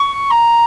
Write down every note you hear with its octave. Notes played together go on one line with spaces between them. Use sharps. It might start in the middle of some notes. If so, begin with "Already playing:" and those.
Already playing: C#6
A#5